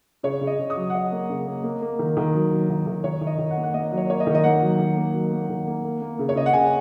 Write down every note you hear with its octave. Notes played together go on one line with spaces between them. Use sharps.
C#3 C#5
C#3
D#5
C#3
D#6
F#3
F#5
F#3 D#5
A#3
C#3
A#3
A#3
A#3
D#3
D#3
F#3
F#3
D#3
D#3
D#3 C#5
D#3
D#5
D#3
F#5
A#3
F#5
A#3 D#5
F#3
C#5
A#3 C#5
D#5
D#3
D#5
A#3 F#5
F#3
D#3
A#3
F#3
A#3
D#3
A#3
A#3
A#3
C#3
C#5
C#3 D#5
F#5
C#3 G#5